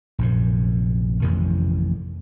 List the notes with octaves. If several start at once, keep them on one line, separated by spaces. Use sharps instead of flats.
A#1 F#2 C3
A1 F2 C3 D#3